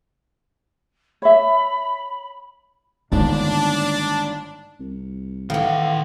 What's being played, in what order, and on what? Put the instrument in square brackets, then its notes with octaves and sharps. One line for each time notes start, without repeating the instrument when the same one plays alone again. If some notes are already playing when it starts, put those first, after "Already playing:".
[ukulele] C#5 E5 [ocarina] B5
[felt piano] G1 G#2 D#3 [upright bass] A#3 [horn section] D4
[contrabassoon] C2
[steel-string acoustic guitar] A2 E3 [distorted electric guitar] D#3 F#5 [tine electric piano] F5